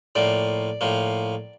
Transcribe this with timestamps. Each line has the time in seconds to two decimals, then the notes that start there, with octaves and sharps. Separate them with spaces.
0.15 A2 F3 A#3 D5
0.81 A2 F3 A#3